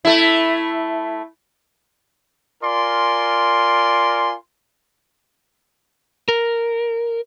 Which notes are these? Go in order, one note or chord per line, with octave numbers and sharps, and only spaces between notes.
A3 E4
F4 A#4 D5 G#5 C6
A#4